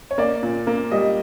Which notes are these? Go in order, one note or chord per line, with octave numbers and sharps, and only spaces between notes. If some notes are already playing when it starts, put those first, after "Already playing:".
C#5
A#3 D5
A#2
A#3
G3 D#5